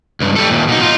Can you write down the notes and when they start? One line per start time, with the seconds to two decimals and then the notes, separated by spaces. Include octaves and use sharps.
0.20 C#2 G2
0.36 G3 A4
0.50 D#2 A#2
0.68 B2 D#4
0.82 D#4 F4